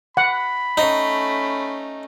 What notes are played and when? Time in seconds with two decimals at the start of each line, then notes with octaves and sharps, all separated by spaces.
0.17 F#5 B5
0.77 A3 C#4 D#4